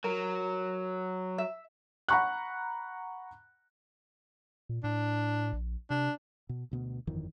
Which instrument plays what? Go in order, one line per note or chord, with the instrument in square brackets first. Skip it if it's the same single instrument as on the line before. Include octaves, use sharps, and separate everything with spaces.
[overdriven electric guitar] F#3 [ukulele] A#4
[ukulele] E5
[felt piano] F#5 A#5 B5 C#6 F#6
[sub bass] A#2
[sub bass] A2 [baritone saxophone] D4
[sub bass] A#1
[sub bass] C3 [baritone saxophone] D4
[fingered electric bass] B2
D2 B2 B3
G1 F2 D#3 E3